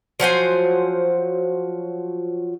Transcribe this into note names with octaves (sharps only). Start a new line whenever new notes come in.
F3 F#3 C5 G#5